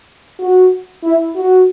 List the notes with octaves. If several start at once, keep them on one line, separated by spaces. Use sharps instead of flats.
F#4
E4
F#4